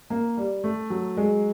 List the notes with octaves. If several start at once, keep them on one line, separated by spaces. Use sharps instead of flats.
A#3
G3
A3
F#3
G#3